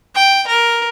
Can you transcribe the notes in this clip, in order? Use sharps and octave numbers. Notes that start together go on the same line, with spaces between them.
G5
A#4